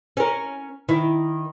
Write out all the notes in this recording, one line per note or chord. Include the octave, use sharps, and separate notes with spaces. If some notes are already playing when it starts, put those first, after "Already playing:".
C#4 A#4
D#3 E4